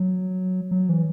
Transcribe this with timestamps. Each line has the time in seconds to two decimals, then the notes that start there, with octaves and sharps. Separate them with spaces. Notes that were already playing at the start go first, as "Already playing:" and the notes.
Already playing: F#3
0.71 F#3
0.89 E3